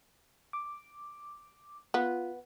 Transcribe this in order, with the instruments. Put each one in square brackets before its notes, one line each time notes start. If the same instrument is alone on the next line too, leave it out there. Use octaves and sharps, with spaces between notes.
[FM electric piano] D6
[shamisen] B3 [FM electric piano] F4